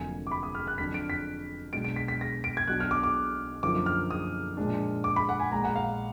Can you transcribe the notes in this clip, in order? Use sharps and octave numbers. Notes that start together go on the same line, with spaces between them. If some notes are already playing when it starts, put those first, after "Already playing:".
Already playing: F1 F2 D3 F#3 A#3 G#5
D6
B5
D#6
F6
F#6
F2 D3 F#3 D4 B6
D7
B6
B1 B2 G#3 D4 D7
D7
B6
B6
A#6
D7
G#6
B1 B2 F#3 D4 F#6
F6
D6
D6
F#2 D3 F3 A#3 D#4 D6
F6
D#6
A#2 F3 G#3 D4
D6
B5
F#5
G#5
A#1 A#2 G#3 A#5
F#5
F5